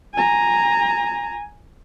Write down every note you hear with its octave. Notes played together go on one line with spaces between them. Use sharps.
G#5 A#5